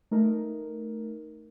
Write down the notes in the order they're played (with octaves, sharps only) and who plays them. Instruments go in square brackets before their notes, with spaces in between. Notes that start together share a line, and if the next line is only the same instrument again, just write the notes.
[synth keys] A3 D#4 A#4